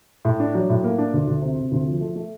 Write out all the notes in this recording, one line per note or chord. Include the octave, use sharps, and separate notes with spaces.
A2
D4
F#3
A2
A#3
D4
D2
D2
C3
C3
D2
F3
A3
A3